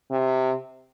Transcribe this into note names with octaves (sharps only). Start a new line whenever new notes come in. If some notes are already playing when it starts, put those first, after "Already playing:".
C3